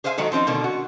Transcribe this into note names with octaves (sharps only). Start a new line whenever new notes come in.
G#4 C5 E5 F5 G#5
D#3 F#3 G#3 F#4 A4
F3 C4 C#4 D#4
B2 D3 D#3 A#3
F#4